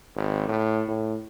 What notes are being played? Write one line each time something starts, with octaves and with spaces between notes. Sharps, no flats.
G#1
A2
A2